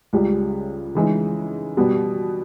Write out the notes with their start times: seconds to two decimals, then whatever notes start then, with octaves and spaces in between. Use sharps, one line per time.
0.13 C#2 C#3 G3
0.95 C#3 E3 G#3 D#4
1.77 B2 G3 B3